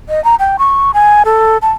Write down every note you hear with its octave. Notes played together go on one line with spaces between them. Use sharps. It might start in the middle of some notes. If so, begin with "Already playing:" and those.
D#5
A#5
G5
C#6
G#5
A4
A5